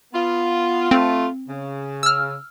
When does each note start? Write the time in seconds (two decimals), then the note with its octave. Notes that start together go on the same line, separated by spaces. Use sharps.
0.13 B3 F4
0.91 A3 C4 F4
1.48 C#3
2.03 E6 F6